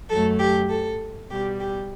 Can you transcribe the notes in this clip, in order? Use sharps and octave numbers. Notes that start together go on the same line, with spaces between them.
F#2 F#3 A3 A4
G4
A4
B2 G3 G4
G4